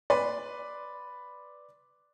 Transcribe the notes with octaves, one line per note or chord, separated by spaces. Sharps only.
B4 D5 C6